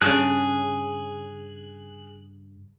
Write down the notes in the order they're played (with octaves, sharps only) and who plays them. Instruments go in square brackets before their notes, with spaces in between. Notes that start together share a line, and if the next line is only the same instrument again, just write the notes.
[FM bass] G2 [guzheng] C#3 A5 [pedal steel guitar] G#4 F#6